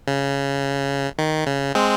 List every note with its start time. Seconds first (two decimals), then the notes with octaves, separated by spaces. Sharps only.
0.08 C#3
1.19 D#3
1.47 C#3
1.75 G#3 C4